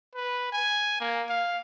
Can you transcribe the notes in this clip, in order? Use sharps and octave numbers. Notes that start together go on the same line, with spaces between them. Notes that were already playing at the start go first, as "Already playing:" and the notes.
B4
G#5
A#3
F5